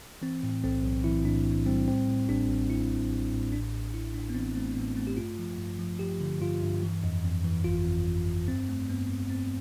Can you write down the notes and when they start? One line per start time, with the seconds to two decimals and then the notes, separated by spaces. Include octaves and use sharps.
0.22 E3 C4
0.43 A2
0.64 B1 C4
0.84 B1
1.04 E3 E4
1.25 A2 D4
1.46 A2
1.66 G3 C4
1.88 A2 C4
2.07 A2
2.28 A1 D4
2.49 A1
2.70 A2 E4
2.91 A2
3.10 A1
3.32 A2
3.52 A1 D4
3.73 A1
3.93 A2 E4
4.14 A2 D4
4.30 B3
4.35 E3 C4
4.55 A3 C4
4.76 A2 B3
4.97 A3 C4
5.07 G4
5.17 G2 F4
5.39 F3
5.58 G2
5.79 F3
5.99 F3 G4
6.21 D3
6.41 G2 F4
6.62 G2
6.83 E3
7.04 F2
7.24 F2
7.44 E3
7.64 G1 F4
7.85 F2
8.06 F2
8.27 F2
8.48 G2 C4
8.69 A3
8.89 G2 B3
9.09 G2
9.30 G2 C4